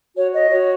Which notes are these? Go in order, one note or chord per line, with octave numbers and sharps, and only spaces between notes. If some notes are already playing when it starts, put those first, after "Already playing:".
F#4 C#5
C#5 D#5
F#4 C#5